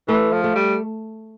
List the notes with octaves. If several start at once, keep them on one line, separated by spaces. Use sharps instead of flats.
E3 A3
F3
A3
G3